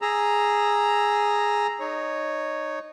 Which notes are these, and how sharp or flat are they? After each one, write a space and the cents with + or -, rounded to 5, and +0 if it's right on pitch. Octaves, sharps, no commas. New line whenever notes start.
G#4 +0 A#5 +0 E6 +0
D#4 -20 C#5 +0